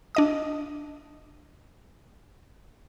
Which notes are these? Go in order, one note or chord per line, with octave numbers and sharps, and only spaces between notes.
D4 D#5 D#6